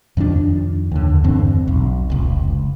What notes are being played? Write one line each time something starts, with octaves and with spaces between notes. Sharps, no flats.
F2 D#3 F3 D4
D#2 D3
E2 G2 D3 C4
B1
F1 C#2